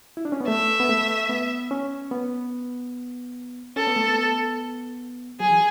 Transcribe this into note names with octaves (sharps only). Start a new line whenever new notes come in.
E4
D4
C#4
B3
A3 E5
B3
A3
B3
C#4
B3
C#4 A4
B3
A3
B3
F#3 G#4
E3